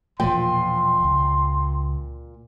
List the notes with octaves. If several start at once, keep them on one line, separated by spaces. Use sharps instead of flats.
E1 A#2 F3 G5 C6
C#2